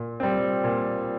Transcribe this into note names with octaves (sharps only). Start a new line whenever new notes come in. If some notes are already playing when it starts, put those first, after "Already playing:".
Already playing: A#2
G3 C4
A#2